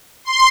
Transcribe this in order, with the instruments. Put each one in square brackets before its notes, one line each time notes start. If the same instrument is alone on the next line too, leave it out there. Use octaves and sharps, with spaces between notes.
[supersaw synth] C6